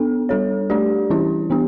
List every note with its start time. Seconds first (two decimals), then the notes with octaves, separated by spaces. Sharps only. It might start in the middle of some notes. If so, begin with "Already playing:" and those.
Already playing: B3 D4 A4
0.29 G3 D4 A4 C#5
0.70 A3 D4 G4 D5
1.10 E3 G3 C#4 E4 G4
1.50 E3 B3 D4 G4